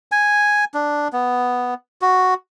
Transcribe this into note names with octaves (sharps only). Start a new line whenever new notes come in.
G#5
D4
B3
F#4